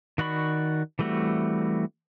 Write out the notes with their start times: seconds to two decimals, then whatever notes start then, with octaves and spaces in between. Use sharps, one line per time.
0.18 D#3 F#4 D5 B5 C#6
0.99 E3 G3 A3 C4 F#4